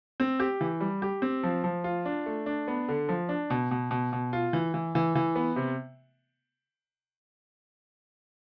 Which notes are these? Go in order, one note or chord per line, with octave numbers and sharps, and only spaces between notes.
C4
G4
E3
G3
G4
C4
F3
F3
F4
D4
A3
D4
B3
D3
F3
D4
B2
B2
B2
B2
F4
E3
E3
E3
E3
B3
C3